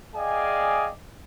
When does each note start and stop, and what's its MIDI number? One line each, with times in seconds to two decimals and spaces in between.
0.16 0.90 68
0.16 0.90 74
0.16 0.90 75
0.16 0.90 77
0.16 0.90 79
0.16 0.90 80